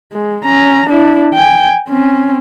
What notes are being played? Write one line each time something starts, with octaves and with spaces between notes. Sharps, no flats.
G#3
C#4 A#5
D4 E4
G5 G#5
C4 C#4